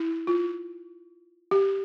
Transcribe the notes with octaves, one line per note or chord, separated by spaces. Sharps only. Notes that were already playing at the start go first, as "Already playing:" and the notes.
Already playing: E4
F4
G4